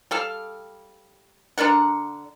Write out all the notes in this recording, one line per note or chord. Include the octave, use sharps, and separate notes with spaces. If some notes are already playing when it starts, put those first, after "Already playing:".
G3 A4 F5
D3 D4 A#4 F#5